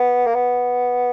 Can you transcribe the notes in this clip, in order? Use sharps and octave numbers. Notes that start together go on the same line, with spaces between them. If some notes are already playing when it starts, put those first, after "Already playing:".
Already playing: B3
A#3
B3